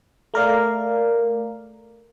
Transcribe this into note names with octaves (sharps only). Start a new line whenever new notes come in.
A3 A#4 D5 F5